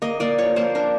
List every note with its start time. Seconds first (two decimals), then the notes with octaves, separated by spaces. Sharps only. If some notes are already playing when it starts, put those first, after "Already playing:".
0.02 A#3 D#5
0.20 A#3 D5
0.38 F3 C#5
0.56 A#3 C5
0.75 D4 A#4